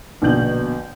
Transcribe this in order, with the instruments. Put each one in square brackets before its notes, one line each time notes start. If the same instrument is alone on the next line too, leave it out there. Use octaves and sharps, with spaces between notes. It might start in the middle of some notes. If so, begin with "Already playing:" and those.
[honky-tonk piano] A#1 B2 D3 G6 F#7